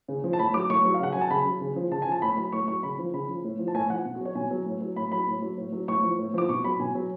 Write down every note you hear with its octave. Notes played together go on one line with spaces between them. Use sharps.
C#3
F3
A5
A2 B5
F#3 D6
A2 C#6
F#3
F5
C#3 F#5
F#3 G#5
A5
C#3 B5
F#3
C#3
F3
C#3 A5
G#5
F3 A5
A2 B5
F#3 B5
A2 C#6
F#3 C#6
C#3 B5
F3
C#3 B5
F3
A2
F3
A5
A2 G#5
F3 F#5
B2
F#4
F#3 C#5
B2 G#5
F#3
A2
F#3
A2 B5
F#3 B5
A2
F#3
A2
F#3
A2 C#6
F3
A2
F3 D6
B2 C#6
F#3 B5
B2 G#5
F#3